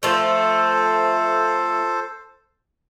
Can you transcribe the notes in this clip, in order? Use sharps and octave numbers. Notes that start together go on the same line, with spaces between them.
F3 A3 A4 C5